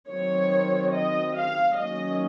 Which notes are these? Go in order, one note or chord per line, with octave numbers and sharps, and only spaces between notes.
D#3 F#3 C4 C#5
D#5
F5
D#3 F#3 A#3 C#4 D#5